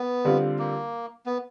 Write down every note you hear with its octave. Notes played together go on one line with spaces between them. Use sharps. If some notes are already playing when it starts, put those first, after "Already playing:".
Already playing: B3
D3 G3 C4 F4
A#3
B3